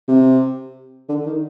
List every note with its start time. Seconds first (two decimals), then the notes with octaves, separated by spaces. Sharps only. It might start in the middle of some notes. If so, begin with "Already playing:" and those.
0.08 C3
1.09 D3
1.26 D#3